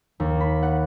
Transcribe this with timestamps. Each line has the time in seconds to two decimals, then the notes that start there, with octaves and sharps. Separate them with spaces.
0.20 D#2
0.40 B5
0.63 F#5